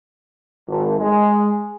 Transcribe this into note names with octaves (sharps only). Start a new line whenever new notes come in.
G#1
G#3